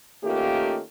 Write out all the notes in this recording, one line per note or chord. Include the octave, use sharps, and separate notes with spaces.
D#3 A3 A#3 C#4 F4 G4